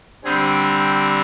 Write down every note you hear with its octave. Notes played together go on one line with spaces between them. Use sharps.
D3 G3 C4 G#4